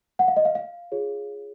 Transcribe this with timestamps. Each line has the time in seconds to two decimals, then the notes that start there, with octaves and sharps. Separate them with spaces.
0.19 F#5
0.28 F5
0.37 D#5
0.45 F5
0.55 F5
0.92 F4 G#4 C#5